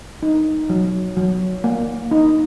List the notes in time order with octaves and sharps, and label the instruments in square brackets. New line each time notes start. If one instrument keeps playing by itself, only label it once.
[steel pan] D#4
F#3
F#3
A#3
D#4